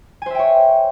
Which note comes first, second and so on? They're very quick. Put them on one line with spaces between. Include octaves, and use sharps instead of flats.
G#5 C5 E5 G5 C#5